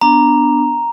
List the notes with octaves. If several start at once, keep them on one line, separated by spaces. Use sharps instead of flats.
B3 D4 A#5